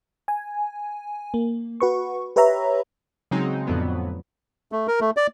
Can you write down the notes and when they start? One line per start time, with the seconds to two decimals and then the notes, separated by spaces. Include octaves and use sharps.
0.28 G#5
1.34 A#3
1.80 F#4 B4 C#6
2.36 G4 B4 C#5 E5 A#5 B5
3.31 C#3 F#3 G#3 C4 D#4
3.67 F2 A2 D3 F#3 B3
4.72 A3
4.88 A#4
5.01 A3
5.17 D5